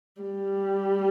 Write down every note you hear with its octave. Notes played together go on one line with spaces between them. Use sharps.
G3